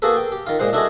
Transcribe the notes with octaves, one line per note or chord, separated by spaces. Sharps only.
A#3 F#4 G#4 A4 B4
G5
G4
D#3 F4
A#2 G#3 C5 F#5
D4 E4 F#4 A4 D#5 G#5